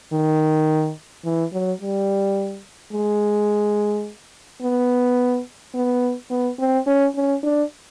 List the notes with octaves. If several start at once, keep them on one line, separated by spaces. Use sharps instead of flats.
D#3
E3
F#3
G3
G#3
B3
B3
B3
C4
C#4
C#4
D4